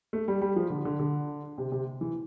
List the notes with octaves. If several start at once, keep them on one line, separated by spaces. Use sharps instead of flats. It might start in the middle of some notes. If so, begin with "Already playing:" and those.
A3
G3
G3
F3
D3
D3
D3
C3
C3
E3